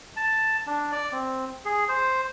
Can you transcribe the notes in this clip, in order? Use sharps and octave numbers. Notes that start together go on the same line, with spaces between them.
A5
D4
D5
C4
G#4
C5